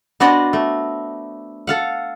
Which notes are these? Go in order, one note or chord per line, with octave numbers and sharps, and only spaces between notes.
B3 D4 F#4 C5 D5 D#5
A3
A4 F5 F#5